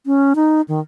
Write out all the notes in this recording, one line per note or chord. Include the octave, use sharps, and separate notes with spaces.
C#4
D#4
D#3